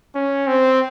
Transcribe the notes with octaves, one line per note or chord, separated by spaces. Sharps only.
C#4
C4